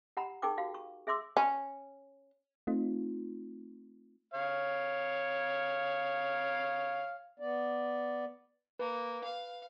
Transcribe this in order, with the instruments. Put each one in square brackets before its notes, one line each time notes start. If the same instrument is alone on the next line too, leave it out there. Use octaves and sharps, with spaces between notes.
[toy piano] G4 F#5 A#5 B5
D#4 G#4 A#4 G5 C#6 D6
F#4 G4 F5
C#6
G#4 E5 C6 D6 E6
[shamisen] C#4
[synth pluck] A3 C4 D#4 F4
[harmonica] C#5 F5
[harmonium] B3 D5
[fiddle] A#3 [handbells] B4
[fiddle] F5